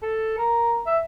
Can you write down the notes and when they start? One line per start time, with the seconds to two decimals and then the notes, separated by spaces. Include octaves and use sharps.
0.02 A4
0.38 A#4
0.86 E5